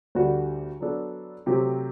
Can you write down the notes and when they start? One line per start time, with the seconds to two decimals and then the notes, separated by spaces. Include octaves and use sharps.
0.15 D2 D3 G3 D4 F#4
0.80 F#3 B3 D4 A4
1.46 C3 F#3 A3 C4 G4